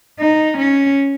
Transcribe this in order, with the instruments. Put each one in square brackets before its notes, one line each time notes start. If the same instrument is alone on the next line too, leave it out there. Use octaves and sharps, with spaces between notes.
[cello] D#4
C#4